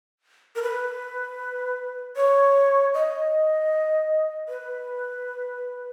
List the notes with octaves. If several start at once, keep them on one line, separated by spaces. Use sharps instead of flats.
A#4
B4
C#5
D#5
B4